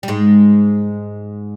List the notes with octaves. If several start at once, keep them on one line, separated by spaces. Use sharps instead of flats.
G3
G#2 G#3